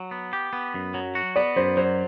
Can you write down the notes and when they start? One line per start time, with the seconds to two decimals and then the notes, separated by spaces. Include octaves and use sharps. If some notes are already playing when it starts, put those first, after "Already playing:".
Already playing: F#3
0.11 B3
0.33 G4
0.53 B3
0.74 F#2
0.94 F#3
1.15 F#4
1.36 B3 D5
1.56 F#2 C5
1.77 F#3 C5